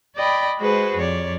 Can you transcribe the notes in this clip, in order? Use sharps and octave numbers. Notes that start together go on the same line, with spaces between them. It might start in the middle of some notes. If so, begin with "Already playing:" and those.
D5 D#5 G5 B5
G#3 F#4 G#4 B4 C5
F2 C#5 D5